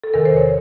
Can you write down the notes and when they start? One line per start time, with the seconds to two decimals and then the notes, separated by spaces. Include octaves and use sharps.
0.04 A4
0.14 E2 C3 D#3 A#4
0.25 C5
0.37 C#5